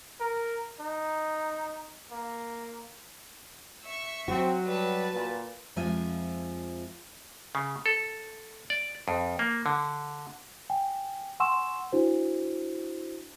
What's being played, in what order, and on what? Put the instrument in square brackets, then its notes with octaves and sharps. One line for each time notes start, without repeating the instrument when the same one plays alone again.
[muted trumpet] A#4
D#4
A#3
[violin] E5 C#6
[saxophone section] F#3 [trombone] C4 [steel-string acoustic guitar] F#4
[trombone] G3 [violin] B4 A5
[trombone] A#2
[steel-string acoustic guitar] F2 F3 G#3 F4 E5 G#5
[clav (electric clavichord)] C#3
A4
D5
F2
A#3
D3
[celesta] G5 G#5
F#5 G#5 C6 C#6 E6 E7
D4 E4 F#4 C5